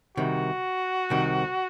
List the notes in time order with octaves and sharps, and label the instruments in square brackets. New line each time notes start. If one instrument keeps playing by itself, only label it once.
[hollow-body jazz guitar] C2 C3 D#3 [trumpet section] F#4
[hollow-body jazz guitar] C2 C3 D#3